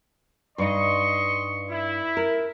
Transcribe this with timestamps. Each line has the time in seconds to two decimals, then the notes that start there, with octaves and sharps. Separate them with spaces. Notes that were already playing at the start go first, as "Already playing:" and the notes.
0.58 G2 D#4 D#5 C6 C#6
1.70 E4
2.17 A#4